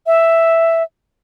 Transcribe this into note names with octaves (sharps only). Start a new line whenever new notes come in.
E5